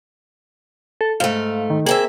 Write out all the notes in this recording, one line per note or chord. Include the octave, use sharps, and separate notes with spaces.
A4
G#2 A3 F5
D#3
A#3 C4 G#4 E5